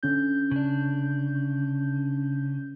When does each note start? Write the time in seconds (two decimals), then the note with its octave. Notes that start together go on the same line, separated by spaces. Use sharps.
0.03 D3 C#4 G6
0.51 C#3 D4